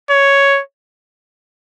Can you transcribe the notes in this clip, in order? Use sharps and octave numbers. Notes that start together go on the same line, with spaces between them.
C#5